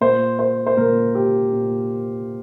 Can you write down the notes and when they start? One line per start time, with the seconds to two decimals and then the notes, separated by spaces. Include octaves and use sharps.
0.01 A#2 C5
0.39 C5
0.66 C5
0.77 A#2 A#4
1.15 G4
1.53 A#2